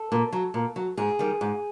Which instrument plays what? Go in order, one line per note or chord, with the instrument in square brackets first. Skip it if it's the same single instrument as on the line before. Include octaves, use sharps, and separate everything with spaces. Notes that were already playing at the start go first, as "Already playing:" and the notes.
Already playing: [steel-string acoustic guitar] A4
A#2
F#3
A#2
F#3
G#2 G#4
D#3 G3
G#2